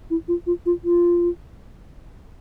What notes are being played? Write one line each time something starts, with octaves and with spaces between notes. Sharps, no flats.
E4
F4
F4
F4
F4